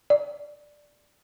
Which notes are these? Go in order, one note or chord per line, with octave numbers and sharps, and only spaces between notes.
D5